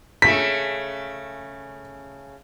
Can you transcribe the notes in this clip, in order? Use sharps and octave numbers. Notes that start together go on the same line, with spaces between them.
C#3 A3 B6